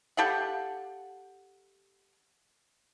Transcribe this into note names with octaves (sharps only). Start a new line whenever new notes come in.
G4 A4 F5 F#5